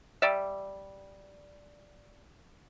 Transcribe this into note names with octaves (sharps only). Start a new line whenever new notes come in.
G3 D5 E5